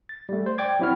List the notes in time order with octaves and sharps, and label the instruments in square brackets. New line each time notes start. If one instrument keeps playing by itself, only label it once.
[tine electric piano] A6
G3 A3
C5
D5 G5 D6 G#6
F#3 C4 E4 F#4 F6